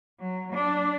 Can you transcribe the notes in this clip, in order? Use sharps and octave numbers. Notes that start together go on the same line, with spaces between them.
F#3
D4